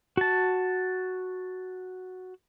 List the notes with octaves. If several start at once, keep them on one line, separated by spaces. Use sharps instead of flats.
F#4 A5